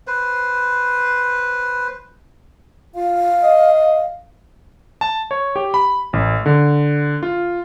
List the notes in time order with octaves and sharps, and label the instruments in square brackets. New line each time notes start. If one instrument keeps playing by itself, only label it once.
[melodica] B4 C5
[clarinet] F4 [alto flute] F5
[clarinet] D#5
[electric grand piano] A5
C#5
G4
B5
A1
D3
F4